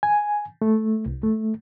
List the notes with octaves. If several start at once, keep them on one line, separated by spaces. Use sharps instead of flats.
G#5
A3
C2
A3